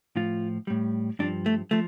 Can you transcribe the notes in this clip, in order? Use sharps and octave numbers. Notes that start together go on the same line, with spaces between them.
A2 F3 F4
A2 G3
G2 F3 D4
A3
F3 A3